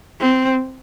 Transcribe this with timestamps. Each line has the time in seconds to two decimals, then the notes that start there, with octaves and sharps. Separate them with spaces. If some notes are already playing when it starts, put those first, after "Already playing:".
0.20 C4